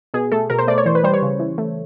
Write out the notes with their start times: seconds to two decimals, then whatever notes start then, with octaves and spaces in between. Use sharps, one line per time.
0.14 B2 G#4
0.32 A3 A4
0.50 B2 A#4
0.59 C5
0.68 A3 D5
0.78 C#5
0.86 E3 C5
0.95 B4
1.04 G3 C5
1.14 C#5
1.22 C#3
1.40 E3
1.58 A3